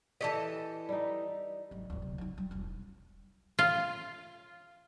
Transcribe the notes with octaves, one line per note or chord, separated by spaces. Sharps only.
E3 G4 A4 D#5 A5
G3 D#4
G#1 F#3
D1 G#1
C3
F#3 D#4
G3
E1 B1
F4